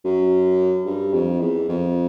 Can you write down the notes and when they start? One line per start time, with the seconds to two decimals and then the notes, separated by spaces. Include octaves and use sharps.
0.04 F#2
0.86 G2
1.14 F2
1.40 E2
1.69 F2